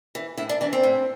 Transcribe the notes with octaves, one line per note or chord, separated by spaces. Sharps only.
E3
A2 E4
D4
E3 D4
C4
A2